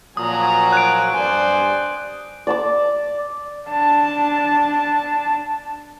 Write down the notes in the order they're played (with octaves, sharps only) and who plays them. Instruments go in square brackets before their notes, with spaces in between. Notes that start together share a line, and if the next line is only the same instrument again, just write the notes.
[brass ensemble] A#2 F3 F#3 [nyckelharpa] G#5 A#5 [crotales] D#6
[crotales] F#6 D7
[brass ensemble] G2 G#5 [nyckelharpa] C5 D5
[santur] D5 A5 D6
[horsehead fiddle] D4 A5